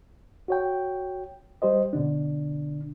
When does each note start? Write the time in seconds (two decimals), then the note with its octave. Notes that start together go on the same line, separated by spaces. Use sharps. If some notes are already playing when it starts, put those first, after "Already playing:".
0.48 F#4 C#5 G5
1.62 G3 G4 C5 D#5
1.93 B2 D3 D4